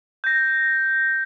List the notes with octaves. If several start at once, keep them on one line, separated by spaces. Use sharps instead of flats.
G6 A#6